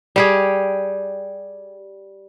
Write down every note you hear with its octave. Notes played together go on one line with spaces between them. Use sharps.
G3 G4 G#4